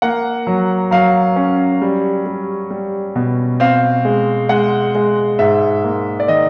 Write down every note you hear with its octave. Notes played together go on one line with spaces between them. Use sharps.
A#3 F#5
F#3
F#3 F5
C#4
G3
G3
G3
B2
C4 F5
G#3
G#3 F#5
G#3
G#2 E5
A#3
D5
D#3 D#5